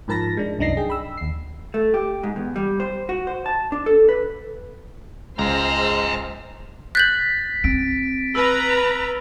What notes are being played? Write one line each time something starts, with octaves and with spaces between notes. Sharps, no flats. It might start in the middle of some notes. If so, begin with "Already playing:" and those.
G#2 F3 A#4 A5 B5 A#6
G#3 D4
C2 F#2 D4 D#4 A#6 C7
G#4 G5
B5 E6
D#2 C7
A3
G4
G#2
E2
G3
C5
F#4
C5
A5
D4
A4
B4
C#2 G#3 C5 G#5 A#5 F6 A#6
F#6 G6 A6 B6 F#7
C4 D7
B4 A#5 E6 F6